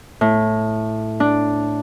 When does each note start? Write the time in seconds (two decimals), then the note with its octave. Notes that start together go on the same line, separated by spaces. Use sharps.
0.21 A2
1.20 D4